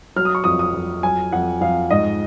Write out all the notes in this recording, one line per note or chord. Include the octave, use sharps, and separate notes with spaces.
F#3 F6
D#6
C#6
F2 D#6
D#6
F2
F#3 G#5
F2 F#5
F2 F5
G#2 D#5